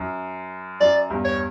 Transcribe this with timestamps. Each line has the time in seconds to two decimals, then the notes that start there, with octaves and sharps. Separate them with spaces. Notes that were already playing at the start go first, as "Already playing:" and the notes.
Already playing: F#2
0.81 F#2 D5
1.10 E2 G2
1.25 C#5